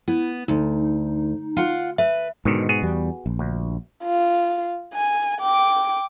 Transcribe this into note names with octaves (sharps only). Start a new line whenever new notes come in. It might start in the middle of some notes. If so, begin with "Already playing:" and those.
B3 E4
D2 D#4
F4 F#5
B4 E5
G#2 B2 D3 D#3
B3 F#4 G#4
E2 G3
A#1
D2
F4
G#5
G5 D6